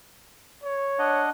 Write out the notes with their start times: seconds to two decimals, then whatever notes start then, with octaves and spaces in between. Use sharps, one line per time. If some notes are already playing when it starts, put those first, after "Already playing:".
0.64 C#5
0.99 D4 D#5 F#5